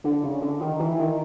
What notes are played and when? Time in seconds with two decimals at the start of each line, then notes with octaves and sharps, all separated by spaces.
0.04 D3
0.23 C#3
0.41 D3
0.61 D#3
0.79 E3
0.99 D#3